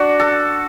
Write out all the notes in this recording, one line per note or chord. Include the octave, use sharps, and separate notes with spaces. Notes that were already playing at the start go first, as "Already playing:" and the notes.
Already playing: D4 F#4
A4